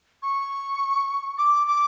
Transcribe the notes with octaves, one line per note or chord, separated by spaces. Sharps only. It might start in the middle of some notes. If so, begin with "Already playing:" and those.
C#6
D6
D6